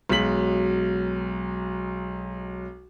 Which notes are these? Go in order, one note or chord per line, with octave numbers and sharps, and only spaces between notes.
B1 F#3 G#3 B6 F#7